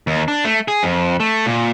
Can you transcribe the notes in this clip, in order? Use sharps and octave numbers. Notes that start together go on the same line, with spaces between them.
D#2
D4
A3
G#4
F2
A3
A#2